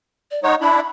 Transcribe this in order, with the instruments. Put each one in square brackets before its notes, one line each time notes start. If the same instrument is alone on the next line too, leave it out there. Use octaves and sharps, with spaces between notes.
[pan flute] D5
[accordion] G#3 D#4 C#5 [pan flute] F#5
[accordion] D4 E4 [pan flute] B5